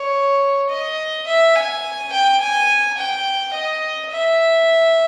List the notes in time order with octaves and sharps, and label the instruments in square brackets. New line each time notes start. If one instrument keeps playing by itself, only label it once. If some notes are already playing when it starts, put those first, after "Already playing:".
Already playing: [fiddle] C#5
D#5
E5
G#5
G5
G#5
G5
D#5
E5